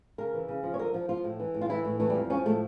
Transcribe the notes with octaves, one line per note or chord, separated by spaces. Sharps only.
C#3 A#4
E3
C#3
F3
C#5
D3 A#4
F3
F3 F4
A2
E3
A2
F4
E3 E4
A2
E3 A3
G3
F2
F3 C#4
A2 A3